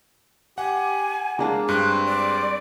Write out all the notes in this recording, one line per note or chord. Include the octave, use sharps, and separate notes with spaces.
G4 F#5 G#5
G#3 A#3 D4 A5
G2 C4 F#6
D5